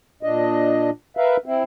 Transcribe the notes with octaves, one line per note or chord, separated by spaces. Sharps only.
A#2 D4 D#5
A#4 B4 E5 F5
C4 E4